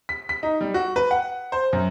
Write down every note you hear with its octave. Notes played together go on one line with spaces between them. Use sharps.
B6
B6
D#4
G3
F#4
B4
F#5
C5
F#2